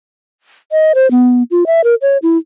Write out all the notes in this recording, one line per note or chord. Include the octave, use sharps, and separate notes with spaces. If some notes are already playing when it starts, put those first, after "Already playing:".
D#5
C5
B3
F4
E5
A#4
C#5
E4